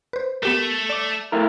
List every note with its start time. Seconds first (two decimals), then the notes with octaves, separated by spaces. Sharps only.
0.13 B4 C5
0.43 A3 B3 G4 A#4
0.90 D5 D6
1.32 A3 E4 A#4